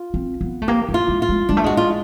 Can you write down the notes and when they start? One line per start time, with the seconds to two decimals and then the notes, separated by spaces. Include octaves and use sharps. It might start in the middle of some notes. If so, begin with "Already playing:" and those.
Already playing: F4
0.14 C4
0.41 B3
0.62 A3
0.68 A#3 G4
0.89 A3
0.94 F4
1.08 G#3
1.22 F4
1.29 G#3
1.49 G#3 D4
1.57 A3
1.64 G#3 F#4
1.77 F4